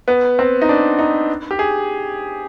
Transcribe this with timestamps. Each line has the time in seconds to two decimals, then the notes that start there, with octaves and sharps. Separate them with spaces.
0.08 B3
0.39 C4
0.62 D#4
0.69 D4
0.99 D#4
1.51 G4
1.59 G#4